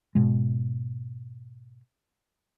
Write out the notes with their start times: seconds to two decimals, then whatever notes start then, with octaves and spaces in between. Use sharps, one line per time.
0.15 G#2 B2 G#3